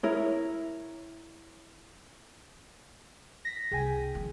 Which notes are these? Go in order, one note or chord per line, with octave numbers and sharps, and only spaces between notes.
E4 A#4 C#5
A#6 B6
C2 G#4 G5 G#5
D#3 F3